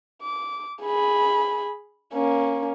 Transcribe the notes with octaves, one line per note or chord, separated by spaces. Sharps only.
D6
G#4 B5
A#3 C#4